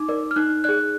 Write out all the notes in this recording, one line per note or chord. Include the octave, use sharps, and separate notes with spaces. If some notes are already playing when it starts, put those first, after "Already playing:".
Already playing: D#4 D6
A#4 D5
F6
D#4 F#6
G#4 D5 F#6